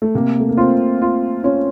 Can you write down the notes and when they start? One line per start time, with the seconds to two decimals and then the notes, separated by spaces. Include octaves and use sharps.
0.02 A3
0.15 C3 A#3
0.40 A3
0.49 A#3
0.57 C4 F4
1.02 F4
1.44 C#4 F4